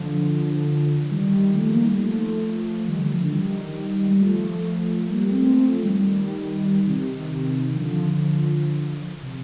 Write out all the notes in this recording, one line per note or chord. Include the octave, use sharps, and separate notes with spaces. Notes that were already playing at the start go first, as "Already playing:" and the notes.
Already playing: D3 F3
D#3 G3
F3 A3
G3 A#3
D#3 G3
F3 A3
D#3 G3
D3 F3
D3 F3
D#3 G3
G3
F3 A3
G3 A#3
A3 C4
A3 C4
F3 A3
D#3 G3
D#3 G3
C3 D#3
D3 F3
C3